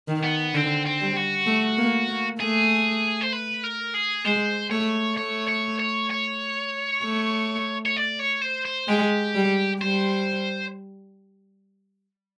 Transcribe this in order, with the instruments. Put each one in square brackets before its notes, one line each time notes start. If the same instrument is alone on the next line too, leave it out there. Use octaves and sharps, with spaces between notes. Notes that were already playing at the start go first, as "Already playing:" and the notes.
[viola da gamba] D#3
[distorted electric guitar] B3
[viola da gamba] D3 [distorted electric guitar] C4
[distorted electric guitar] C4
[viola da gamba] G3
[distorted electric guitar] F#4
[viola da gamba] A3
A#3
A#3
[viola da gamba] A3 [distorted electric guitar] G#4
[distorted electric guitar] C5
B4
A#4
G#4
[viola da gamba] G#3 [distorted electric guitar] C5
[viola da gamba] A3 [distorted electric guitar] C#5
[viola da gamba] A3 [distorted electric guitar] C#5
[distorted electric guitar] C#5
C#5
C#5
[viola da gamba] A3
[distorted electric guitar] C#5
D5
C#5
C5
C5
[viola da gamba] G#3 [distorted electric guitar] G4
[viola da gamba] G3
[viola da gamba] G3 [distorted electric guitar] C5